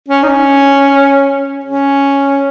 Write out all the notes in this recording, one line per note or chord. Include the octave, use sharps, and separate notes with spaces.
C#4
D#4
C#4
C#4